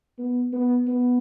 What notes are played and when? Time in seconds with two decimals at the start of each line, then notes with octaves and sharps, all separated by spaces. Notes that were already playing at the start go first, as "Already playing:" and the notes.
0.18 B3
0.53 B3
0.87 B3